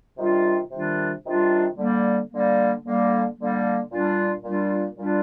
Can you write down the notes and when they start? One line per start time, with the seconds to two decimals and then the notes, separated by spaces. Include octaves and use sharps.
0.17 C3 D#3 G3 D4 F4
0.70 C3 D#3 G3 D4 F4
1.24 C3 D#3 G3 D4 F4
1.77 D3 G3 A#3
2.30 D3 G3 A#3
2.84 D3 G3 A#3
3.37 D3 G3 A#3
3.91 A#2 G3 D4 F4
4.43 A#2 G3 D4 F4
4.97 A#2 G3 D4 F4